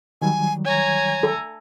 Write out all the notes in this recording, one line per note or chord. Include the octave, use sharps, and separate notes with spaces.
D#3 F#3 G3 G#5
C#5 G#5 A#5
A4